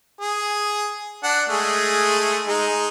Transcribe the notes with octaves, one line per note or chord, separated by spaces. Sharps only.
G#4
D4 F#5
G#3 A3 G#4
G#3 D#4